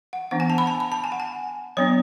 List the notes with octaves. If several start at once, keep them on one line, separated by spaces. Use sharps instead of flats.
F#5
E3 B3 D4 F#5
G#5
A5
B5
A5
B5
A5
G#5
F#5
G#5
F#3 B3 D4 C#5